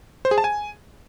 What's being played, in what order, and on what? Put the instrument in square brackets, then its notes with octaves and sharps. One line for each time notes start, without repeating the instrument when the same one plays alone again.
[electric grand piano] C5
G#4
A5
G#5